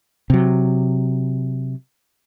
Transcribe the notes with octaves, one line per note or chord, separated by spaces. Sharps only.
C3 F#3